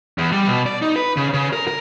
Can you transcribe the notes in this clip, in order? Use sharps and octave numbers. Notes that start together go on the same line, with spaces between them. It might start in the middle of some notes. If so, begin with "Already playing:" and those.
E2
G3
B2
D5
D#4
B4
C#3
C#3
A#4
A#4